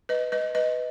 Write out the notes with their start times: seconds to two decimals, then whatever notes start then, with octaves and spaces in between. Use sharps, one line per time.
0.09 B4 D#5
0.32 B4 D#5
0.55 B4 D#5